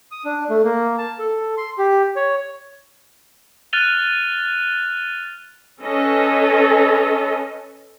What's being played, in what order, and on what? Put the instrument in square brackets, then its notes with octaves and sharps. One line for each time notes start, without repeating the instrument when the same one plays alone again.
[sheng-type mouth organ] D#6
D4
A3
A#3
A5
A4
C6
G4
C#5
[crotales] F6 F#6 A6 D#7 F7 G7
[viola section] C#4 A4 B4 D#5